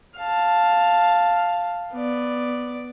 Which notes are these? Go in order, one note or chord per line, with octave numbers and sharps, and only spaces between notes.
F5 A5
B3 D5